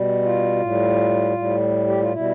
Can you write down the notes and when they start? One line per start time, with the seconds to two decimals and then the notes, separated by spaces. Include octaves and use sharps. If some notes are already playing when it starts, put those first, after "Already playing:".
Already playing: B2 G3
0.24 F4
0.61 A2 G3
1.37 A2 G3
1.88 G4
2.00 F4
2.12 B2 G3 E4